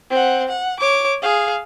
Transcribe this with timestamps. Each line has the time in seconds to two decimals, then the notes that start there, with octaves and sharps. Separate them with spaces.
0.11 C4 F#5
0.48 F#5
0.80 C#5 D6
1.22 G#4 F5